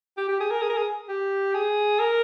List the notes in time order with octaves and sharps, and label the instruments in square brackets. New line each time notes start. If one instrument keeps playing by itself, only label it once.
[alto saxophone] G4
G4
G#4
A#4
G#4
A#4
G#4
G4
G#4
A#4